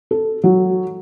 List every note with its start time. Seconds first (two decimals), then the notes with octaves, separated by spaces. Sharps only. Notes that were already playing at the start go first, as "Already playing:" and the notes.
0.11 A4
0.44 F#3